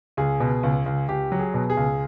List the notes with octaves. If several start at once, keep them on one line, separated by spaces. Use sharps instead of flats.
C#2 G#4
B2
C#2
C#2
C#2 G4
F#3
G#4
B2
G#4
C#2